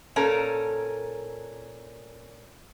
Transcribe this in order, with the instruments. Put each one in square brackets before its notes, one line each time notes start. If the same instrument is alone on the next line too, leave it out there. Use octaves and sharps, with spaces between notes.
[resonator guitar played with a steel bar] A#2 C#4 A4 A#4